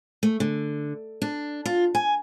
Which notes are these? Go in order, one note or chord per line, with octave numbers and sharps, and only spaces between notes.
A3
D3
D4
F4
G#5